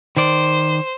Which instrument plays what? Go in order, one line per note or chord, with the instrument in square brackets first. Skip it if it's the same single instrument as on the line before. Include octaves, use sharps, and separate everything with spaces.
[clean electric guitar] D#3 D5 [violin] C5